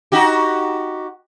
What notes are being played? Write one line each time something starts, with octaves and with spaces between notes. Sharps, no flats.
D#4 F#4 G4